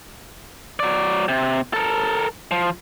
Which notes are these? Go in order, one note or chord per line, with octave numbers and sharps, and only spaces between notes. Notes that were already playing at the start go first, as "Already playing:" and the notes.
F#3 D5
C3
A4 A#4
F3